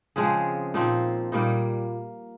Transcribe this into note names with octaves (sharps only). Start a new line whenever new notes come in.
C#3 F3 G#3 C4 G#4
A#2 F3 C4 D#4
A#2 G3 A#3 D#4